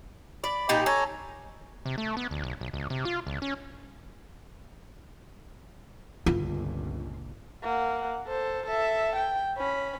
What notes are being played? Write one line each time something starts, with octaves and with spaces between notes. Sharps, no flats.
D5 B5
A#2 D#4 G4
A4 C#5 G#5 A#5
C3
A3
B3
D2
B1
B1
C#2
C3
F4
C#2
C#4
G1 C#2 A#2 F4
A#3 F#5
A4 C5
A4 E5
G5
C#4 B5